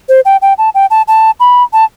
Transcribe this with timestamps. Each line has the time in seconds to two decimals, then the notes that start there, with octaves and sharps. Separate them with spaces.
0.09 C5
0.25 G5
0.42 G5
0.58 A5
0.75 G5
0.91 A5
1.08 A5
1.40 B5
1.73 A5